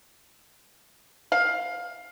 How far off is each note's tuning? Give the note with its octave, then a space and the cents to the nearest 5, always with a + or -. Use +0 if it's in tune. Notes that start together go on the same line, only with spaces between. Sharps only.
F5 +15